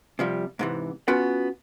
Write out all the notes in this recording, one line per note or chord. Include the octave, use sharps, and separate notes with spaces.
C3 F3 G3
G#2 C3 E3
B3 C#4 F4 F#4 B4